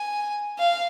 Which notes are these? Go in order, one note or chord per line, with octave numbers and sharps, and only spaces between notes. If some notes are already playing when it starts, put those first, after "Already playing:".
Already playing: G#5
F5